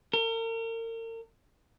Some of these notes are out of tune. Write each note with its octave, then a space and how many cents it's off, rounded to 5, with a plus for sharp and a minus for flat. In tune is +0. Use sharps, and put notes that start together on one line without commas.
A#4 -40